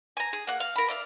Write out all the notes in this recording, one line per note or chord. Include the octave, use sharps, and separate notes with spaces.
G#5 A#5
G#4
A#3 F#5
F5
A#4 B5
D5 E5 F5